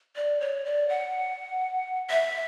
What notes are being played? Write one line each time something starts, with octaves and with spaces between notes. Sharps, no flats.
D5
C#5
D5
F#5
E5